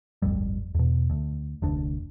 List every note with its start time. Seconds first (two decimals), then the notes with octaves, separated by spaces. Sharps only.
0.22 D1 G1 F2 G3
0.75 E2 B2
1.10 D2
1.62 F1 D2 D4